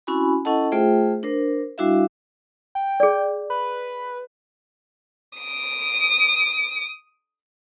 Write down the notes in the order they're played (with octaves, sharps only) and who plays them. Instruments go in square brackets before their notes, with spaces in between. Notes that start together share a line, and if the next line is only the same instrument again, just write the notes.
[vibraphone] C4 C#4 E4 F#4 G#5 B5
C#4 E4 A4 D#5 F#5 A5
A3 F4 G#4 C5 E5 G5
D4 A#4 C5
G3 D4 E4 F#4 E5 F5
[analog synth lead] G5
[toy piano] G#4 D5
[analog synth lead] B4
[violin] D#6 D7